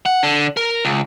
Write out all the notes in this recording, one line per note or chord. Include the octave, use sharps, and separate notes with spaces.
F#5
D3
A#4
C#2